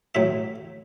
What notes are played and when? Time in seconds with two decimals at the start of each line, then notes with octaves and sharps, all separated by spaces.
0.15 A2 F#3 E5